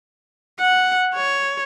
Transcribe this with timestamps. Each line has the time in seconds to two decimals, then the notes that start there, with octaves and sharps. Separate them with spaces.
0.60 F#5
1.15 C#5